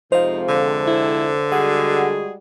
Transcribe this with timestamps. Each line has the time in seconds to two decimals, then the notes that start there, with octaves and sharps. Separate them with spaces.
0.12 F2 C3 F3 G#3 D#4 C5 F5
0.48 D3
0.87 E4
1.52 G3 G#3 F#4 G#4 F#5